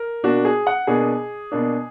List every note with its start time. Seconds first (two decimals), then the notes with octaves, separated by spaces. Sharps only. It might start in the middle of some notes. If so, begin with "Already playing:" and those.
Already playing: A#4
0.23 B2 A#3 D4 F#4
0.45 G#4
0.67 F#5
0.87 B2 A#3 D4 G#4
1.52 B2 A#3 D4